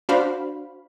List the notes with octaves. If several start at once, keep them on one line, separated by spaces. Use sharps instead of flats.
D4 F#4 C5 F5 B5